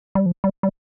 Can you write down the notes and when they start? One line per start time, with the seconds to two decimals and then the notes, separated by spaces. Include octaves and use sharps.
0.15 G3
0.26 F3
0.44 G3
0.63 G3